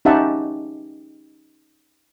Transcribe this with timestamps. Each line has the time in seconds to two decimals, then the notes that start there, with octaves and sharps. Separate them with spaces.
0.05 C#4 D#4 G4 E5 F#5 A5